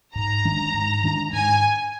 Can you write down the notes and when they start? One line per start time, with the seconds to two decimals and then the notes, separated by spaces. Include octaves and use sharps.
0.15 G#2 A#5
0.45 D#3 G#3 D4
0.74 G#2
1.04 D#3 G#3 D4
1.33 G#2 G#5